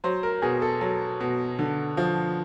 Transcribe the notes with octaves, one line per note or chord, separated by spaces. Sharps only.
F#3 C5
A#4
B2 G#4
A4
F#3
B2
D3
F3